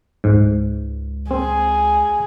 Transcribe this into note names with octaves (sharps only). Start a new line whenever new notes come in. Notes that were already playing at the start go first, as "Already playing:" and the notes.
C#2 G#2
C4 G#4